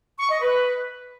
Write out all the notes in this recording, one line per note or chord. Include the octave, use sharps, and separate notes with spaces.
C#6
D#5
B4